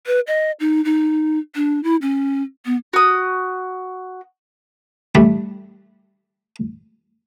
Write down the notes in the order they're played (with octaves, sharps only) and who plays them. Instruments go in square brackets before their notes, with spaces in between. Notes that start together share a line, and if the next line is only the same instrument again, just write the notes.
[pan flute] B4
D#5
D#4
D#4
D4
E4
C#4
B3
[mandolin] F#4 D#6
[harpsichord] G3 A3 D4